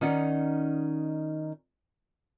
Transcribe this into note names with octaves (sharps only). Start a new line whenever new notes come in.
D#3 C#4 D#4 D5 F#5